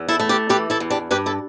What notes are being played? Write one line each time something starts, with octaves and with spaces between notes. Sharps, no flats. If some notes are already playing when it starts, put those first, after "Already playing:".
Already playing: E2
E4 A4
A3
G4 B4
E3 G4 B4
E4 A4
E2
D4 G4
G2 G4 B4
E4 A4